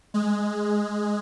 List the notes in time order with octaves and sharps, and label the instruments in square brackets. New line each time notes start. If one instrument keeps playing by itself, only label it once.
[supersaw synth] G#3